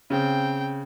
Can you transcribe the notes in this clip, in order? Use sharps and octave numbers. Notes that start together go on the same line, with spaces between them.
C#3 C4 G5